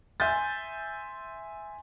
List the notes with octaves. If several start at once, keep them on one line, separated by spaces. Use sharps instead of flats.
E5 G#5 C6 G6 A6